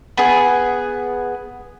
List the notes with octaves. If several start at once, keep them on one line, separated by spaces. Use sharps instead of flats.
B3 G#4